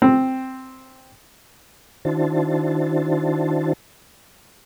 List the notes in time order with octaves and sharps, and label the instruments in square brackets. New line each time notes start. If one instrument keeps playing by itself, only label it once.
[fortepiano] C4
[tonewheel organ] D#3 D4 E4 F#4 C5 A5